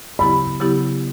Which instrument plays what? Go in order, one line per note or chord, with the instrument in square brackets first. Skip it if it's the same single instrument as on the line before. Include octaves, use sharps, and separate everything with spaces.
[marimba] C#3 F#3 B3 E4 G4 [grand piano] B5
[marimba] C#3 F#3 B3 E4 G4